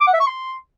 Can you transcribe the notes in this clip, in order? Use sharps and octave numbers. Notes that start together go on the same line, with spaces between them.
D6
F#5
E5
C#6
C6